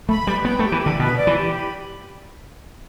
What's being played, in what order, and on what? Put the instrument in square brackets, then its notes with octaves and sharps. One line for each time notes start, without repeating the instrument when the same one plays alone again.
[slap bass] A3 [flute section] B5
[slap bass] G3 [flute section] B4
[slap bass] B3 [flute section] G5
[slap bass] A3
[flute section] G4
[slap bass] E3
[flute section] B5
[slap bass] D3
[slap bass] B2 [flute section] B4
[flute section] D5
[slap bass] E3
[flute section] G4
B5